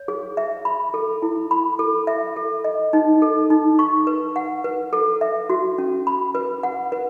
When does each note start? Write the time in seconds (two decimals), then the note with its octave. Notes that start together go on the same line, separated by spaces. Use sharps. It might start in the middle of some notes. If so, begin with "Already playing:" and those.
Already playing: C#5
0.08 G#4
0.37 E5
0.65 B5
0.94 A4
1.22 E4
1.51 B5
1.79 A4
2.07 E5
2.36 A4
2.64 D#5
2.93 D#4
3.22 A4
3.50 D#4
3.79 C#6
4.07 B4
4.36 F#5
4.64 B4
4.93 A4
5.21 E5
5.49 F#4
5.78 C#4
6.07 B5
6.35 B4
6.63 F#5
6.92 B4